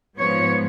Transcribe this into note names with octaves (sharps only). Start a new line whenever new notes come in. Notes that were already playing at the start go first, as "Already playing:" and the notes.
G#2 F3 B3 C#5